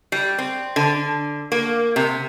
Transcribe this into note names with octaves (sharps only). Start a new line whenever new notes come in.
G3
C4
D3
A#3
C3